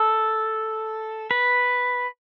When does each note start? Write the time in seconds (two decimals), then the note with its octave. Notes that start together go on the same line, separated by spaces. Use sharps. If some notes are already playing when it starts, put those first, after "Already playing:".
Already playing: A4
1.31 B4